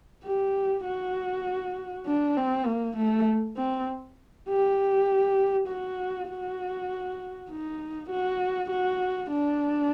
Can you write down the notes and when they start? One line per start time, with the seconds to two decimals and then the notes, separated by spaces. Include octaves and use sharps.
0.25 G4
0.84 F#4
2.06 D4
2.36 C4
2.66 A#3
2.97 A3
3.57 C4
4.48 G4
5.68 F#4
6.29 F#4
7.50 D#4
8.10 F#4
8.70 F#4
9.31 D4